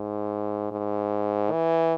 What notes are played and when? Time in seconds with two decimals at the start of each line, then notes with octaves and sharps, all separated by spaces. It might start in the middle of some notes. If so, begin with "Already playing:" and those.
Already playing: G#2
0.71 G#2
1.52 E3